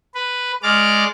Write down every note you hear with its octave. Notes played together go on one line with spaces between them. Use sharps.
B4
G#3 D5 D6 F6